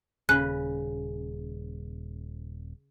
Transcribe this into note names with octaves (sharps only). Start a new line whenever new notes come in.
D#1 C#3 B4 F#6